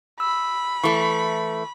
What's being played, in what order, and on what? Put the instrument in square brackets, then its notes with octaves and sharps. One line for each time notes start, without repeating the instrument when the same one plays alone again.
[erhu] B5 [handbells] E6
[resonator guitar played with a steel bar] E3 A3 [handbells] C#6